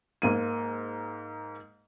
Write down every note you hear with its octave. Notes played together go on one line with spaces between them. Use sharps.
G#2 A#3 D#7